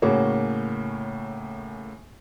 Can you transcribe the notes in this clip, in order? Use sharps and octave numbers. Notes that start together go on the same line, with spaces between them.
A2 C#3 A#3 C#4 F#4